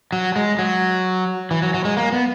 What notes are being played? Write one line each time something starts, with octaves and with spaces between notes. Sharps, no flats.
F#3
G#3
F#3
E3
F#3
F#3
G#3
A#3
B3